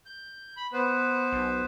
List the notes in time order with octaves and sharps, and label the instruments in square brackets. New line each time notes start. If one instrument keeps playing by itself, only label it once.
[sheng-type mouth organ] G6
B5
B3 B4 C5
[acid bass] B1